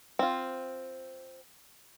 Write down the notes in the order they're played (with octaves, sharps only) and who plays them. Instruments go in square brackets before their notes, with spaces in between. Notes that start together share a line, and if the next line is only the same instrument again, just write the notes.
[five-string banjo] C4 F4